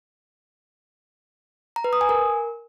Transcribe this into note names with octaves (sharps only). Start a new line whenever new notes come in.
A#5
B4
D#6
G#5
A#4